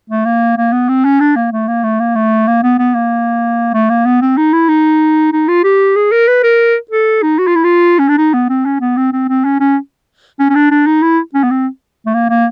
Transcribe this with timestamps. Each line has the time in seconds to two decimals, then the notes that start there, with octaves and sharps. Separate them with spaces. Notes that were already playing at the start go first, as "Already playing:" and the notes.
0.10 A3
0.25 A#3
0.57 A#3
0.72 B3
0.89 C4
1.04 C#4
1.20 D4
1.36 A#3
1.52 A3
1.68 A#3
1.83 A3
2.00 A#3
2.15 A3
2.47 A#3
2.63 B3
2.79 B3
2.94 A#3
3.74 A3
3.90 A#3
4.06 B3
4.22 C4
4.37 D#4
4.53 E4
4.69 D#4
5.32 D#4
5.48 F4
5.64 G4
5.96 G#4
6.12 A#4
6.28 B4
6.43 A#4
6.91 A4
7.22 D#4
7.39 F#4
7.47 F4
7.55 E4
7.64 F4
7.99 C#4
8.08 D4
8.18 D#4
8.34 B3
8.49 C4
8.65 C#4
8.81 B3
8.97 C4
9.13 C4
9.28 C4
9.44 C#4
9.60 C#4
10.39 C#4
10.49 C#4
10.55 D4
10.71 D4
10.86 D#4
11.02 E4
11.34 C#4
11.43 B3
11.51 C4
12.06 A3
12.14 A#3
12.29 A#3